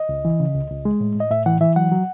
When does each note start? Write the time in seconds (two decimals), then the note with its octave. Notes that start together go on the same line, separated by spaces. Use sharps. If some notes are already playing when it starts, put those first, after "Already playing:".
Already playing: D#5
0.09 C#2
0.25 E3
0.40 C#3
0.55 C#2
0.70 C#2
0.85 G#3
1.00 A2
1.15 A2 D#5
1.31 A2 E5
1.46 E3 F#5
1.61 E3 E5
1.76 F#3 F#5
1.92 F#3